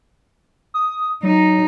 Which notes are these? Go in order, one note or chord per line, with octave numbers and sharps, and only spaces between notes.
D#6
F#3 D#4